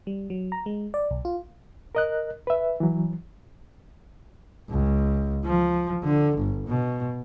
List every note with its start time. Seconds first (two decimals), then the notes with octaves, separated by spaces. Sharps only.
0.07 G3
0.30 F#3
0.52 A#5
0.66 G#3
0.94 D5
1.11 B1
1.25 F4
1.95 A#4 D#5 F#6
2.47 B4 E5
2.80 E3 F#3
4.70 C#2
5.45 F3
6.03 D3
6.37 G1
6.67 B2